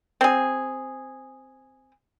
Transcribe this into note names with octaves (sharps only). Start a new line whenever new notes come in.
C4 G#4